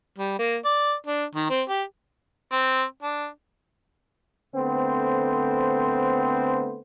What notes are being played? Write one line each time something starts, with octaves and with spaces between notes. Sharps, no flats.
G3
A#3
D5
D4
D#3
C4
G4
C4
D4
D3 A3 B3 C4 C5